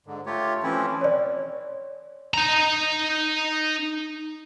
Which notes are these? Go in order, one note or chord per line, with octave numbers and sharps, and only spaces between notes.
G#2 D3
A3 F4 G4 C#5
E3 F3 A3 C4 C#4 E4
C#5 D5
D#4 A#5